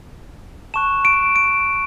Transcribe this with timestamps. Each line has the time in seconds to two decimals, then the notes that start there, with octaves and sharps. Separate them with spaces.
0.74 A5 C#6 F#6 E7
1.05 D7
1.36 D7